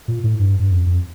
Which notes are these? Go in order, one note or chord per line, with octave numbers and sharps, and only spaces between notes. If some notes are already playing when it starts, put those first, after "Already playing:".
A#2
A2
G2
G2
F2
F2